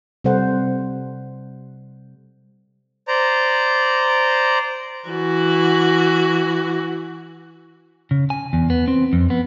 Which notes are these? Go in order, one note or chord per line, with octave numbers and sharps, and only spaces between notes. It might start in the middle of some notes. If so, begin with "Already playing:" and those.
C3 G3 A4 C5 F#5
C5 D5 A#5
E3 F#4
C#3
G#5
E2
B3
C4
F2
B3